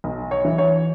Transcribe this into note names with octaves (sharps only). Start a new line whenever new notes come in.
B1
C#5
E3
C#5